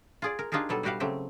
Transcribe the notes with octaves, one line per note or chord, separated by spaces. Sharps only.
F4 G#4 D5
A#4
D4 D#4 F4 G4 G#4 A#4
B2 F#3 G3 A4
G3 E4 F#4 G4 F5 F#5
C#3 F#3 A3 C4 G4